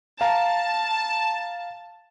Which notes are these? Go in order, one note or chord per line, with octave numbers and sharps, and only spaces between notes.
F5 A5 A#5